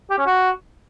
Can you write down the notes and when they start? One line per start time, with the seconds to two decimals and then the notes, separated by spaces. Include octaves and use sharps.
0.10 G4
0.19 C#4
0.27 F#4